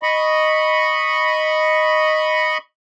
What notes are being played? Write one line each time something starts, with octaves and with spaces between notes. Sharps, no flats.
D#5 B5 C#6